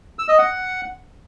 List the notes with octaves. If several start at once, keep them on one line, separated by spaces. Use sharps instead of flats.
E6
D#5
F#5